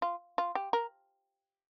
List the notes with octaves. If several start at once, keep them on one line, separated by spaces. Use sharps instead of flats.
F4
F4
G4
A#4